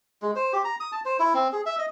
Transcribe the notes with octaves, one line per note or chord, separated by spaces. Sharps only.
G#3
C5
G4
A#5
D#6
A5
C5
E4
C4
G#4
E5
D#5